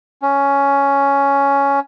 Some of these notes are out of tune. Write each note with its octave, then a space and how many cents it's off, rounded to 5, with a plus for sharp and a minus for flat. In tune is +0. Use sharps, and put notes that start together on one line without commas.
C#4 +10